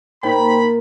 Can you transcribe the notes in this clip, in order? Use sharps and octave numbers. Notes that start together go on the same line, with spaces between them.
A#2 D#4 C5 G5 B5